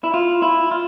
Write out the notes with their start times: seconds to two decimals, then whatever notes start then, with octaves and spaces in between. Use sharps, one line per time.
0.04 E4
0.14 F4
0.42 E4
0.71 F4